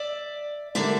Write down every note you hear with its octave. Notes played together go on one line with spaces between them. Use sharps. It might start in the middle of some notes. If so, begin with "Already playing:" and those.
Already playing: D5 E5
D3 G3 A#3 D5 E5